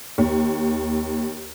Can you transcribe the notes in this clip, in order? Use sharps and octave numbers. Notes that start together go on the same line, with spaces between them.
D#2